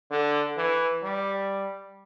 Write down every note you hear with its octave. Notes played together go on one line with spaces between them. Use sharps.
D3
E3
G3